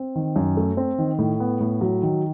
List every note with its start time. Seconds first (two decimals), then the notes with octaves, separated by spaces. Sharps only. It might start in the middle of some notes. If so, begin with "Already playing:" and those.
Already playing: C4
0.15 D#3
0.36 F#2
0.57 A3
0.77 C4
0.98 D#3
1.19 A2
1.40 B3
1.60 A2
1.81 F#3
2.03 D#3